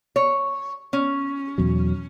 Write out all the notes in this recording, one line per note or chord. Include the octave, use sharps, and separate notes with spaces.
C#5
C#4
E2 B2 F#3